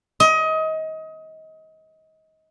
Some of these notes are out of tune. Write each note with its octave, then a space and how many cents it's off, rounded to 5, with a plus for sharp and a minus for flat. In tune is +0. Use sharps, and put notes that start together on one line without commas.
D#5 +25